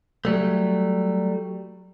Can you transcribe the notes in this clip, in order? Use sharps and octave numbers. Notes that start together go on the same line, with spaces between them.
F#3 G3 A3